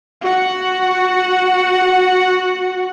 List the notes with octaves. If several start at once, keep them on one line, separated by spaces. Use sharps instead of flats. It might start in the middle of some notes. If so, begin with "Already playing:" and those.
F#4 F#5